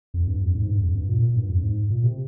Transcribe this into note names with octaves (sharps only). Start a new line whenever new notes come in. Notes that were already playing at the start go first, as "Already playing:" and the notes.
F2
G2
F2
G#2
G2
F2
G2
A#2
A#2
G2
F2
G#2
A#2
C3